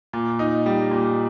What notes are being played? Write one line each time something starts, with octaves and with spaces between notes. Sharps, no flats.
A#2
D#4
G3
A#2